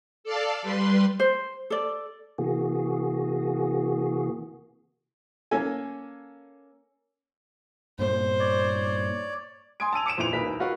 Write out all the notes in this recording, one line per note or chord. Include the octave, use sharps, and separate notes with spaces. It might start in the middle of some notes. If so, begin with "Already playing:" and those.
A4 D5 F5 A5
G3 B4 C6
C5
A4 D5
C3 E3 A#3 F#4 G#4
A#3 C#4 A4 G#5
G2 A#2 A#3 C5
C#5 D5
G#5 C6 D#6 G#6 D7
A5 E6 D#7 F7
D6 C#7 D7 E7
F2 A#2 E3 E4 D7 F7
D#1 B1 E3 A#4 B4 B6
F4 F#4 A#4 B4 F5